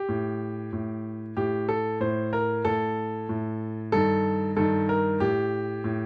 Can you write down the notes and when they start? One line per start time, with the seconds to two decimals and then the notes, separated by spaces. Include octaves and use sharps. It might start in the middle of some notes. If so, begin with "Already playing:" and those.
Already playing: G4
0.09 A2
0.73 A2
1.37 A2 G4
1.69 A4
2.00 A2 C5
2.33 A#4
2.65 A2 A4
3.29 A2
3.92 G2 D#3 A4
4.57 G2 D#3 A4
4.89 A#4
5.20 A2 G4
5.84 A2